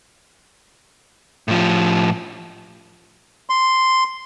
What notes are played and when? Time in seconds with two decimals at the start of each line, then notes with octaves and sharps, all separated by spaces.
1.48 A2 F3
3.50 C6